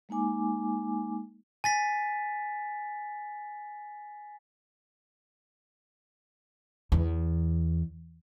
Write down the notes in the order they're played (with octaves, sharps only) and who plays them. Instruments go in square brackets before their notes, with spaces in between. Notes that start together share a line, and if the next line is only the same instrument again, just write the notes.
[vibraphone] G#3 A#3 D#4 G#5 D6
[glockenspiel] G#5 A6 B6
[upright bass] E2